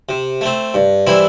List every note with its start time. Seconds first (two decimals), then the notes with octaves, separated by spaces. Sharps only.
0.09 C3
0.41 A3 C4
0.74 G2
1.07 E3 G3 C4 E4